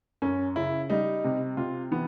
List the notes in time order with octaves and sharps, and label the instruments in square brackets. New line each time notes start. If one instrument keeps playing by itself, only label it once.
[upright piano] F#2 [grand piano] C#4
[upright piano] C#3 [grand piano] E4
[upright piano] G3 [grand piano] D#4
[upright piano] C3
[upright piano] C3 [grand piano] F4
[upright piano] E3 [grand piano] B3